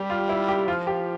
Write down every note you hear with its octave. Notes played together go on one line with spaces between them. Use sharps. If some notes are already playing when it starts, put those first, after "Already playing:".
Already playing: G3 G4
F4
E4
G4
F3 F4
G4